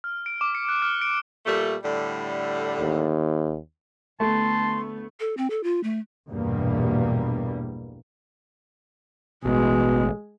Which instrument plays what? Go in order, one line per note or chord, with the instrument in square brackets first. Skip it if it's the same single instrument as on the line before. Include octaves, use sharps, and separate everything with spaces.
[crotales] F6
D7
D6
C#7
F#6
F6
D7
[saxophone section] A#2 G3 A3
A2 D3 G3
[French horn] D#2
[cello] D2 B3 [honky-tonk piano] A3 [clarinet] A5 [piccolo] C6
[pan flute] A4
C4
A4
F4
A3
[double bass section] A#1 E2 G2 B2 G3 A#3
[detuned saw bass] A1 [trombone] B2 [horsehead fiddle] G#3